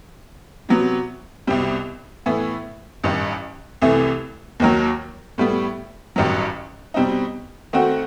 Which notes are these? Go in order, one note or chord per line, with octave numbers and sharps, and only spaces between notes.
C3 F#3 B3
C2 B2 G3 C4
A2 E3 B3
A1 G2 D#3
C2 C3 E3 A3
D#2 D#3 F#3
A2 G3 B3
A1 G2 D#3 F#3
B2 G3 C4 D#4
D#3 A3 C4 F#4